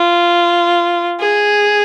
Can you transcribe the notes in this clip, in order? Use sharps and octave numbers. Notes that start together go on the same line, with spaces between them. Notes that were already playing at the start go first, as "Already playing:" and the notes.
Already playing: F4
G#4